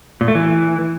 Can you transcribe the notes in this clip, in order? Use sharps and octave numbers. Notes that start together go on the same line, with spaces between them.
A#2
A3
E3